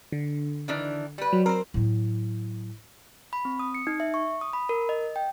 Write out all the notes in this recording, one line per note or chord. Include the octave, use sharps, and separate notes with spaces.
D3
D#3 E3 D4
G3 B4
F#3
C4 A#4 C5
A2 F#3
B5
C4
D#6
C#7
D#4
E5
C#6
D#6
B5
A#4
D#5
G5